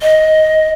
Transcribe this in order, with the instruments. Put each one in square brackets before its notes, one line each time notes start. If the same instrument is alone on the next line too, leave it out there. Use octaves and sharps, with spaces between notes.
[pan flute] D#5